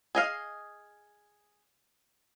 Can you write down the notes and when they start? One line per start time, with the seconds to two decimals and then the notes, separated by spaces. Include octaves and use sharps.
0.15 G#4 D#5 F5